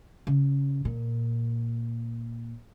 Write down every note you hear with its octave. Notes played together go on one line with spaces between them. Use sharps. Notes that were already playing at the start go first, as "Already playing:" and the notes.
C#3
A#2